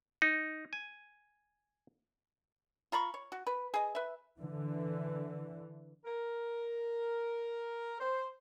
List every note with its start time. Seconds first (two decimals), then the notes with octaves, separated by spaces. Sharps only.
0.22 D#4
0.73 G#5
2.92 F4 A#5 B5 C#6
3.14 C#5
3.32 F#4
3.47 B4
3.74 G#4 D#5
3.95 B4 E5
4.38 D3 E3
6.05 A#4
7.99 C5